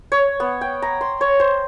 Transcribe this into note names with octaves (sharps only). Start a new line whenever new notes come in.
C#5
B3
G5
A#5
C6
C#5
C5